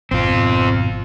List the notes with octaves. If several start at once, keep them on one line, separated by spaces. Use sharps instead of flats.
G#1 F2 B2 C4 F4